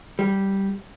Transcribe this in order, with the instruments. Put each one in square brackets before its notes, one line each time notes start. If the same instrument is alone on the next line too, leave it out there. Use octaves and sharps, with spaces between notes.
[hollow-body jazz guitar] G3